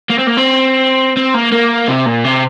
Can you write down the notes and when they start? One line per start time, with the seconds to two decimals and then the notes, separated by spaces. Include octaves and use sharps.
0.10 A#3
0.19 C4
0.27 A#3
0.37 C4
1.17 C4
1.34 A#3
1.52 A#3
1.88 C3
2.06 A#2
2.24 C3